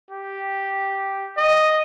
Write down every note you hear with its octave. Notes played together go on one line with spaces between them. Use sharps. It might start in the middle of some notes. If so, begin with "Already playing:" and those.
G4
D#5